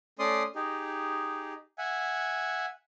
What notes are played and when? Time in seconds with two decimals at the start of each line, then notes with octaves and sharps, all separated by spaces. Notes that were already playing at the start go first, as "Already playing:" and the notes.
0.19 A3 C#4 D5 C6 D#6
0.55 D#4 G4 G#4
1.78 E5 F#5 G#5